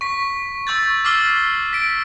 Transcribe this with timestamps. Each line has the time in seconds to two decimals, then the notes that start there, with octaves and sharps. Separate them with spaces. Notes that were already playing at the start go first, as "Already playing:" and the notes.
0.01 C#6 B6
0.67 C#6 E6 G6 A6
1.05 D6 E6 F6 C7 G7
1.73 B6 D7